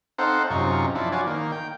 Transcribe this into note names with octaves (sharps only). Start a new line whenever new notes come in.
C4 D#4 A4 C5 F5 F#5
F#2 C3 D#4 F4 C#6
F3 D4 E4
F4 F#4 C#5 D5 G#5
D#3 A#3
G5